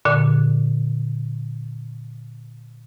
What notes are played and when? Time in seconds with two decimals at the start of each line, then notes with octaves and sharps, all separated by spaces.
0.05 A#2 D3